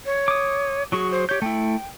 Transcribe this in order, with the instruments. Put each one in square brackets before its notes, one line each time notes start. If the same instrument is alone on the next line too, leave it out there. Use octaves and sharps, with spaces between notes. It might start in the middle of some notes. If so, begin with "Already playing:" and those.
[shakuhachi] C#5
[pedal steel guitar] D6 D#6
[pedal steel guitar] F#3 F#4 G#4 [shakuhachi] C#6
[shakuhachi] C5
[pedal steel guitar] G4 G6 [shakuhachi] C#5
[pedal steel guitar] A3 E4 [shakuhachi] G5